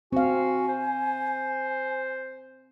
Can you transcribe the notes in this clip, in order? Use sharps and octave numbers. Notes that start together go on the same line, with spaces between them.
C4 F#4 F5 G#5
C5